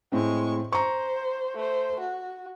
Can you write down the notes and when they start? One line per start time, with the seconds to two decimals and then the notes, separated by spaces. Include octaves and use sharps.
0.12 A2 G#3 C4 C#6
0.73 C5 A#5 C#6
1.55 A3 C5
2.00 F#4